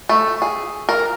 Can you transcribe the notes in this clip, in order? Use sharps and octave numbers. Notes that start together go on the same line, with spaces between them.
A3
G#4
A#4